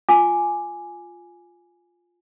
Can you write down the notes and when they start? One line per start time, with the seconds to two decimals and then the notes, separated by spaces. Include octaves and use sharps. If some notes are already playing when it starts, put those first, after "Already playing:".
0.09 F4 G#5 D6